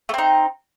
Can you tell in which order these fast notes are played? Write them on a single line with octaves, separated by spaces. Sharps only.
A3 C4 D#4